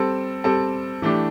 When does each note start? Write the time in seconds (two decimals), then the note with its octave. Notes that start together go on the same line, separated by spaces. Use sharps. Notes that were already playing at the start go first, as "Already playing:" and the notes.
Already playing: G3 C4 A4
0.44 G3 C4 A4
1.02 E3 A3 D4 G4